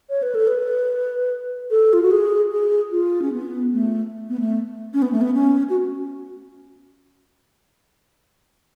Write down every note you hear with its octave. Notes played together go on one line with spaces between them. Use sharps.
C#5
B4
A4
B4
A4
F4
F#4
G#4
G#4
F4
C#4
B3
A3
B3
A3
C#4
B3
A3
B3
C#4
F#4